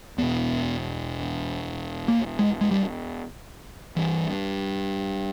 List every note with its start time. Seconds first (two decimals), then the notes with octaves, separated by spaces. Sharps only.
0.18 E2 B2 B3
2.08 A#3
2.39 G#3
2.61 G#3
2.71 G3
3.96 G2 E3